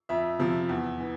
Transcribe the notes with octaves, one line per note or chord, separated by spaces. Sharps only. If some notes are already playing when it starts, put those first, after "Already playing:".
F2 E5
C3 F3
E2
E3